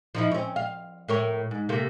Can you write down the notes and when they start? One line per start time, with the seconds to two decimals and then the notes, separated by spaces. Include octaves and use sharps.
0.15 F3 D#4 E4
0.32 C4 C#4
0.56 F5
1.08 A2 A#4 C#5
1.51 G#2
1.69 C3 A3 A#3